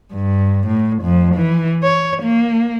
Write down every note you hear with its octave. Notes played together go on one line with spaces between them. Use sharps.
G2
A2
F2
E3
C#5
A#3